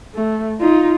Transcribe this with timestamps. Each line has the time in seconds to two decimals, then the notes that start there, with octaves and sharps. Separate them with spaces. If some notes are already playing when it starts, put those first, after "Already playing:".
0.15 A3
0.60 D#4 F4